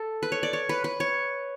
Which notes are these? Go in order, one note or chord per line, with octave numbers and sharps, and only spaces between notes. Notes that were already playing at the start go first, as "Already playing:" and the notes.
Already playing: A4
B4
C#5
D5
C#5
B4
B4
C#5